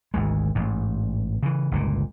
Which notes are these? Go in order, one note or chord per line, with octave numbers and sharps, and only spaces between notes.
G#1 D2 G#3
A1 G#2
C#3 E3
G1 C#2 A#2